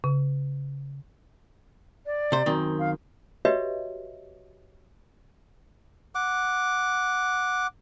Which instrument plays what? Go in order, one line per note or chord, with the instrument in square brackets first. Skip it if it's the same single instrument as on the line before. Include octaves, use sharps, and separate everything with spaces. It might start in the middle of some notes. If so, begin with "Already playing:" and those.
[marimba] C#3
[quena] D5
[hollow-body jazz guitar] C3 C5
F#2 D#3 C4
[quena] F5
[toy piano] F#4 G4 B4 C#5 D#5 E5
[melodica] F#5 D6